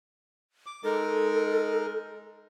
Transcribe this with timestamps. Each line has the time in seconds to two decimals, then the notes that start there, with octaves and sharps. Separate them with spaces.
0.66 D6
0.84 G#3 D#4 A4 A#4